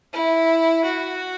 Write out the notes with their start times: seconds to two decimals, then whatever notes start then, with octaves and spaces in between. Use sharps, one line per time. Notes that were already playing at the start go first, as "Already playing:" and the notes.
0.13 E4
0.85 F#4